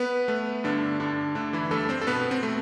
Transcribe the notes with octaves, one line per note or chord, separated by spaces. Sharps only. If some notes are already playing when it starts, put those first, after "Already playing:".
Already playing: B3 B4
A3
G2 D3 D4
G2 D3 D4
D3 A3 D4
E3 E4
G2 A3 A4
C4 C5
A4
B2 B3 B4
C4
A3